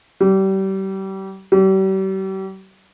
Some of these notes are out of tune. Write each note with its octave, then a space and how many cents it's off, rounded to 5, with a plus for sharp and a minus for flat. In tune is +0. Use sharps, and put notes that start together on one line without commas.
G3 -30
G3 -40